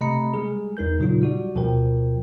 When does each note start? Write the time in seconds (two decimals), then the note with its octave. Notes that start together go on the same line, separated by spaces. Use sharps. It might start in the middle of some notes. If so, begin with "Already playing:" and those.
0.01 C3 A3 D#5 A#5 B5 C#7
0.34 G3 G#3 G#4
0.77 E2 D#4 A#4 G6
0.99 A#2 C#3 F#3 D#4 F4
1.21 G3 F#4 D5
1.55 D2 B2 F3 A#4 G5